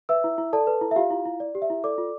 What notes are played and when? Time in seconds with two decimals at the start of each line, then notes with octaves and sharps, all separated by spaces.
0.09 B4 E5 E6
0.24 E4
0.38 E4
0.53 A4 D5 A5
0.67 B4
0.81 E4
0.91 E5
0.96 F4 G4 F5
1.10 E4
1.25 E4
1.40 D5
1.55 G4
1.62 E5
1.70 E4
1.84 A4 D5 D6
1.98 F4